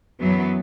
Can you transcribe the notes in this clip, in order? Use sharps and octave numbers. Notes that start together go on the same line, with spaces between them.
F#2 E3 F#3 B3